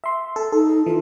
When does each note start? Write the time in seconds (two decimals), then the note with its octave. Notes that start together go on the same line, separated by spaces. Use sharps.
0.04 E5 C6
0.36 A4
0.52 D#4 A4
0.86 E3 F4